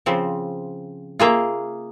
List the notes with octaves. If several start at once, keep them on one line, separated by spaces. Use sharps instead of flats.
C#3 F3 C4
A#3 F4 G#4 E5